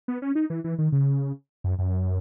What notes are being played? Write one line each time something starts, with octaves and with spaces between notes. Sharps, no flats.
B3
C#4
D#4
E3
E3
D#3
C#3
F#2
F#2